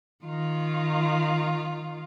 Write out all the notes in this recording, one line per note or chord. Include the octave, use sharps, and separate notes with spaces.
D#3 F4